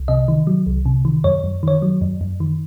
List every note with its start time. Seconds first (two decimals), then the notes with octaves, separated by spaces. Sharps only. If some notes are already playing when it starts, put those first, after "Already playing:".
Already playing: C2
0.08 C3 D#5
0.28 D#3
0.47 F#3
0.66 C2
0.86 C3
1.05 D#3
1.24 F#2 C#5
1.44 F#2
1.63 D#3 C#5
1.82 F#3
2.01 F#2
2.21 F#2
2.40 D#3